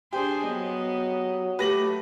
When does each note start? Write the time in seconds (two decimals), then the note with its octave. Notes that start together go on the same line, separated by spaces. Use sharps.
0.13 D4 G4 G#4 C5
0.44 F#3 B3 D#5
1.59 A3 G4 B4 A#6 F#7